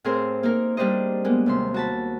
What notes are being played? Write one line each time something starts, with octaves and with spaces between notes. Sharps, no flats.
A2 C4 G#4 A#4 C5 C6
A#3 D#4 A#4
G3 A#3 D4 G4 C5 D#5
G#3 A#3 B3
D#2 C3 C6
F#4 A5 B5